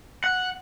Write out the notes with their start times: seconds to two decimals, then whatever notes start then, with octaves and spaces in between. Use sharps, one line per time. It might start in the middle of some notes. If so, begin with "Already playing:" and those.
0.24 F#5